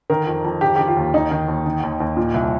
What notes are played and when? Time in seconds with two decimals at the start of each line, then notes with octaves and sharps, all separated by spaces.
0.10 D#3 A#4
0.27 F2
0.44 F2
0.61 D#3 G4
0.76 D#3 G4
0.88 F4
0.97 D#2
1.13 D#2 D#4
1.31 D#3
1.48 D#2
1.66 D#3
1.83 D#2
2.00 D#2
2.17 A#2
2.34 C2